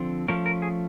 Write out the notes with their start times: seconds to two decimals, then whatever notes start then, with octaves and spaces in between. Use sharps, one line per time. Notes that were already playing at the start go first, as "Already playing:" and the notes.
Already playing: D3 F3 C4
0.28 F3 A3 C#4 A#4
0.46 A#4
0.62 G#4